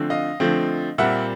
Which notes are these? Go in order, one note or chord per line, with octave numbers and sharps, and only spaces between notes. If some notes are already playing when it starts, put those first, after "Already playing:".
Already playing: D3 F3 A3 C4
D#5 F5
D3 F3 A3 C4
A#2 G3 C4 E5 F#5